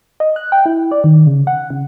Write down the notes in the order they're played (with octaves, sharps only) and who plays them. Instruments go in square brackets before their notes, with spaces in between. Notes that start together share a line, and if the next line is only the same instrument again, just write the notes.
[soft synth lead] D#5
F#6
G5
E4
D5
D#3
C#3
F#5
C#3